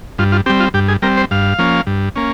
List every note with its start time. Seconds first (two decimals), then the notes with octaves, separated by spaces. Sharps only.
0.19 G2 F4
0.32 F4
0.46 G3 C4 G4
0.60 F4
0.74 G2 G4
0.88 G#4
1.02 G3 C4 A#4
1.17 C5
1.31 G2 F5
1.59 F3 A#3 C#4
1.87 G2
2.16 A#3 C#4